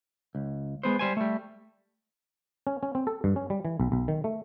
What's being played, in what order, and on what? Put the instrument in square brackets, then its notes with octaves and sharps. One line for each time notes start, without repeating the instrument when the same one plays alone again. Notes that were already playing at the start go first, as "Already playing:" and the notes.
[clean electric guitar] C#2
G#3 B3 C5
G3 C5 G#5
G3 A3
[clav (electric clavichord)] C#4
C#4
C4
A4
G2
C#4
G3
E3
B1
B1
D#3
A3